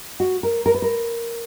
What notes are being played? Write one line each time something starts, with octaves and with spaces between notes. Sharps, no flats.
F#4
A#4
A#4
B4
A#4